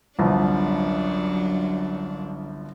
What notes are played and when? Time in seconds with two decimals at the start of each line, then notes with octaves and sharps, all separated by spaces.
0.19 G1 C2 F#2 F3 F#3 D4